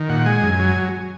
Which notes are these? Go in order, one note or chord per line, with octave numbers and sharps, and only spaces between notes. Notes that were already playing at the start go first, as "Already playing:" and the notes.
Already playing: D#3
A#2 F#5
G#3 G#5
F#2
F#3